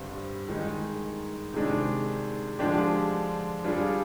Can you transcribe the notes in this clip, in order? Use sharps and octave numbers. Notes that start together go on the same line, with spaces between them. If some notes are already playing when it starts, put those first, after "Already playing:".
Already playing: G2 D3 G3 C4
D#3 G#3 D#4
C3 D#3 G#3 D4
D3 F3 G#3 D4 G4
G3 D4 F4 G#4